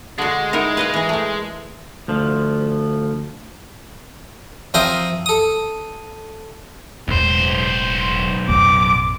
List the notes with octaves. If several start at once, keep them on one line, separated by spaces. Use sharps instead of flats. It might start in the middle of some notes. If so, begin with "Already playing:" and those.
D3 G#3 F#4
D#4 E4 A#4
B4 D#5 F5
E3 A#5
A3 A#4
D2 F3
F3 C4 A#4 C5 E5 D#6
A4 D#6
E1 B1 A2 C5
A1 F2 D6